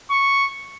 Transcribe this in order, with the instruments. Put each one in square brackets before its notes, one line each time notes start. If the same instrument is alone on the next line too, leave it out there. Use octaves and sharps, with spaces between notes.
[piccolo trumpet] C#6